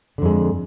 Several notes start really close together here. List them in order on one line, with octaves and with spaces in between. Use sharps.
D3 F2 G#3